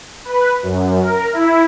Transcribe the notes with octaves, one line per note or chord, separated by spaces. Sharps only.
B4
F#2
A#4
E4